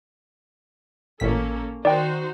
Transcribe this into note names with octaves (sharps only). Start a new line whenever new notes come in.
A1 A#2 A#3 C#4 A4 B6
D#3 D#4 F#4 C5 D5 G5